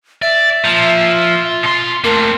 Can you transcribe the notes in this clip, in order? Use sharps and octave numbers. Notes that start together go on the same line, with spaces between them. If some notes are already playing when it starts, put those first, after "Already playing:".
D5 E5
F3 F4 A#5
B2 C6
A3 A#3 C4 F4 A#4